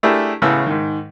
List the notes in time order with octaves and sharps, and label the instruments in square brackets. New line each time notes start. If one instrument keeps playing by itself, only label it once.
[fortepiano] A3 D4 E4 G4 G#4 A#4
A1 A2 C#3 B3 E6
G#2 D#3